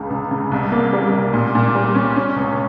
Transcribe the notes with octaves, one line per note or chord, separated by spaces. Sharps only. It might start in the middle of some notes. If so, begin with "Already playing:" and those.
Already playing: C#2 C#3
C#2
C#3
C2
A#3
G3
C2
A#2
A#2
G3
C#4
C#4
C#2